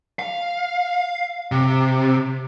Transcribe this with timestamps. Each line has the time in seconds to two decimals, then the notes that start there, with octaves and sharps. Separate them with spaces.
0.19 F5
1.52 C3